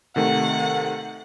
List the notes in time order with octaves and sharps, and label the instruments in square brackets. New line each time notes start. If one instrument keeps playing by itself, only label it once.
[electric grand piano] C3 D#3 A3 [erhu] F#5